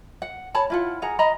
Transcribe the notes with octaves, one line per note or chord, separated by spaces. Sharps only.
F#5
C#5 A5 B5
E4 F4 F#5
G#4 F#5 A#5
D#5 A#5 B5